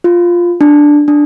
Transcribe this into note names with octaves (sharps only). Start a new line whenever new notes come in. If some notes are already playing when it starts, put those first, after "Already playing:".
F4
D4
D4